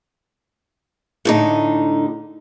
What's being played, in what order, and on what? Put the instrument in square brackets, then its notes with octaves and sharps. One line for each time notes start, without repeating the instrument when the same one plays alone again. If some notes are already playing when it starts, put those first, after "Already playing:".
[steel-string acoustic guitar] A2 D3 D#4